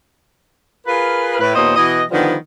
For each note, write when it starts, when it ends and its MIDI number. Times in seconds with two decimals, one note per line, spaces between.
0.87 1.37 65
0.87 1.37 68
0.87 1.37 70
0.87 1.37 71
1.39 1.52 45
1.39 1.52 71
1.55 1.75 39
1.55 1.75 46
1.55 1.75 59
1.55 1.75 72
1.55 1.75 73
1.55 1.75 75
1.76 2.03 47
1.76 2.03 52
1.76 2.03 59
1.76 2.03 75
2.11 2.35 50
2.11 2.35 51
2.11 2.35 53
2.11 2.35 55
2.11 2.35 59